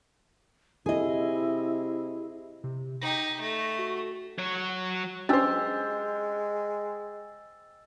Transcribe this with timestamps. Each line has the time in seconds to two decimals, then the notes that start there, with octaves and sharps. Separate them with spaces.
0.86 C3 E4 G#4 D#5
2.64 C3
3.02 D#4 G4 A#6
3.40 A3
3.79 F#4
4.38 F#3 C#5
5.29 G#3 C#4 D4 G4 C5 E6 A6